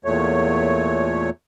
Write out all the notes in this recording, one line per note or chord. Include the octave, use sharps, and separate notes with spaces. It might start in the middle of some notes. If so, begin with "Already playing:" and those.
E2 A#2 A3 C#5